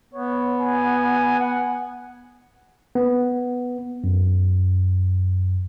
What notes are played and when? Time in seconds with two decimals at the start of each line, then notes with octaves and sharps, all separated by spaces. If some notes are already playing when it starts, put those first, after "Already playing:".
0.13 B3 C#5
0.60 G#5
1.39 F#5
2.95 B3
4.04 F#2